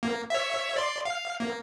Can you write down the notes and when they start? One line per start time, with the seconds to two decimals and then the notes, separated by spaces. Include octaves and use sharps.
0.03 A#3
0.30 C#5 E5
0.76 D5 C6
1.05 F5
1.40 A#3